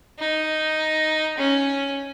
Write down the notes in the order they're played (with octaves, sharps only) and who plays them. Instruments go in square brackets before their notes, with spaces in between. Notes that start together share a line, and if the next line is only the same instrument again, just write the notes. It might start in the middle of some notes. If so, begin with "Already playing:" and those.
[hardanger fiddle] D#4
C#4